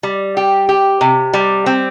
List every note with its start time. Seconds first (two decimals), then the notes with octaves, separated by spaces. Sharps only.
0.03 G3
0.37 G4
0.69 G4
1.01 C3
1.34 G3
1.66 C4